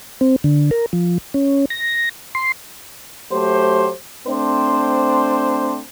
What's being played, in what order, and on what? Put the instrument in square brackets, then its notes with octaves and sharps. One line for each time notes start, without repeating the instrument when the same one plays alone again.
[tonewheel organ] C4
D3
A#4
F3
C#4
A#6
C6
[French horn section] F#3 A3 G4 C5
A3 C4 D4 C5